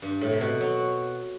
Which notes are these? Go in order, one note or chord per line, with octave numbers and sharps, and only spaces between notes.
G2
A2
C3
B2
F#3